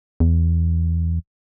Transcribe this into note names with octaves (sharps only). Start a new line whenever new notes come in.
E2